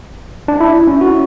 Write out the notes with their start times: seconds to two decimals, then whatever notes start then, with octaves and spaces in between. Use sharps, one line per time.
0.48 D4
0.61 E4
0.87 C#4
1.01 F#4